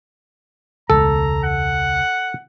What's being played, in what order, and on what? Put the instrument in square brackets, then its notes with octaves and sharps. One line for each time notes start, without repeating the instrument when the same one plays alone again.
[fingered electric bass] E1 C#2 [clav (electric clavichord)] A4 [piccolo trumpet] A#5
[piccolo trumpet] F#5